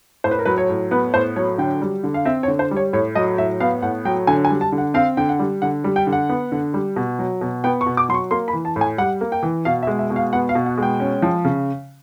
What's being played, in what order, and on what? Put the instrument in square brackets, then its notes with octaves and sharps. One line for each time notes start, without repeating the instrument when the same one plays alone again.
[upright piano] A2 C5
B4
A#4
F#3 B4
C#5
A2
B3 B4
A2 C5
F#3 C#5
D3 G5
G3
D3
F5
C4 E5
C#5
D3
C5
G3
C#5
A2 C#5
F#3 D#5
A2 E5
B3 F5
A2 F#5
F#3 G5
D3 G#5
G#5
G3
A5
D3
F#5
C4 F5
D3 G5
F#5
G3
D3 F#5
G3
G5
D3
F#5
B3
D3
G3
B2
F#3
B2
B3 G5
C#6
B2
D6
F#3 C6
C#6
A#3 C6
B5
E3
A5
A2
G#5
G3 F#5
A#3
G5
E3
B2 F5
E5
G#3
E5
B2
F5
B3 F#5
F5
B2
F#5
G#3 G5
C#4
F3
C#3